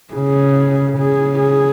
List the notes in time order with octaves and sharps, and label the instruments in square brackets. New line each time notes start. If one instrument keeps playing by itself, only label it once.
[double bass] C#3 [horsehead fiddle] G#4
[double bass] C#3 [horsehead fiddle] G#4
[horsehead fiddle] G#4